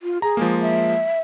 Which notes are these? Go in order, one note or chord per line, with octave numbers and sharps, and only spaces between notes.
F4
G#4 A#5
F3 G#3 A#3
E5